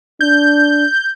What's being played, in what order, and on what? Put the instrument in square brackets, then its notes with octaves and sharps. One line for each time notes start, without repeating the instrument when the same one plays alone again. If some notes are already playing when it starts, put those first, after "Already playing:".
[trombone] D4 [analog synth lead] G6